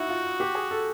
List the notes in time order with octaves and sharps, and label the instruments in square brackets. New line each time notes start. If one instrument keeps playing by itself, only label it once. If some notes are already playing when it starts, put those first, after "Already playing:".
Already playing: [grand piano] D#4 E4 [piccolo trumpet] F#4
[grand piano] F4
G4
G#4
A4